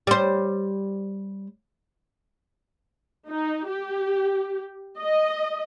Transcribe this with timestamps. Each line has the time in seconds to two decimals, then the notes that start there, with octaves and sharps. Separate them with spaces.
0.07 G3 C5
3.28 D#4
3.70 G4
4.99 D#5